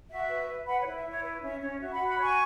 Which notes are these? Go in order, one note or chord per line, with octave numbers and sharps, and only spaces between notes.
F#4 E5
B4
B4
B4 F#5 B5
C#5
E4
E5
E4 C#5
B4
C#4 E5
C#4 C#5
F#4 E5
F#5 B5
F#4
F#5 B5
C#5 G#5 C#6